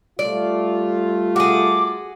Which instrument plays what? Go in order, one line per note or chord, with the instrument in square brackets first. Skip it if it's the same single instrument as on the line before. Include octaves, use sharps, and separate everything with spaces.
[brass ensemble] G3 A3 F4 [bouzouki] D5
[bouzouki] F#4 G#4 [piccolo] D6